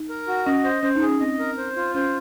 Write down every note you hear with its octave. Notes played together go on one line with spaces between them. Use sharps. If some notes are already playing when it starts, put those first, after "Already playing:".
Already playing: D#4
A#4
F#4
C#4 D#5
C5
C#4 C5
D#4
G#4
C#4
C4 D#5
A#4
C5
F4
C#4 C5